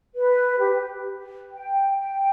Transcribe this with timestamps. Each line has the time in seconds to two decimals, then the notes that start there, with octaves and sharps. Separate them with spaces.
0.15 B4
0.59 G4
0.75 G4
1.51 G5
1.95 G5